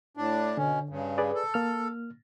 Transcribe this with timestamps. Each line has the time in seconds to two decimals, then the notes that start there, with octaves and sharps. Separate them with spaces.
0.17 A2 D4
0.57 B2 D3 C#4
0.89 G2 C#3
1.18 G#4 B4 D5
1.35 A4
1.54 A#3 F6